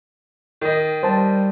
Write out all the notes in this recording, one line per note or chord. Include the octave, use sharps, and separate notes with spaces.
D#3 D#5
G3 C5 A5